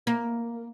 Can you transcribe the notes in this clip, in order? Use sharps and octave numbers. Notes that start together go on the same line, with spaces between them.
A#3